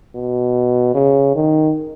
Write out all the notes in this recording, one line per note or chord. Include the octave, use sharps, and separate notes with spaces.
B2
C#3
D#3